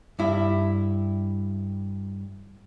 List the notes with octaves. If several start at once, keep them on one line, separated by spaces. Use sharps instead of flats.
G2 E4